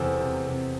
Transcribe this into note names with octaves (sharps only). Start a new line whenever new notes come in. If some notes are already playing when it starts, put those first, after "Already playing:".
Already playing: E2 C3 C4 A4 C5
C3
C3